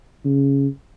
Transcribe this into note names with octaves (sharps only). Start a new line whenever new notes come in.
C#3